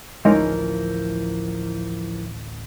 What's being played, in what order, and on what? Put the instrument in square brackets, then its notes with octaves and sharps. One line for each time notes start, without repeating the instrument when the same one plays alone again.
[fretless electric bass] D1 A1 [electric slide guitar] E3 F3 A#4 [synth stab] G#3 C#4 D#4